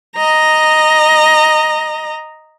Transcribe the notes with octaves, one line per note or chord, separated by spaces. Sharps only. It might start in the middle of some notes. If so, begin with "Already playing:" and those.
D#5 A#5